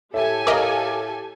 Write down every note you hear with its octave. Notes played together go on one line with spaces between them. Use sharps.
A2 G4 A4 E5 G#5
A#4 D#5 F5 D6